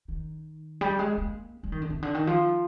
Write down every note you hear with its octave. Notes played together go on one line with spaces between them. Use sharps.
D#3
G3
G#3
A#3
G3
D#3
D3
C3
D3
D#3
F3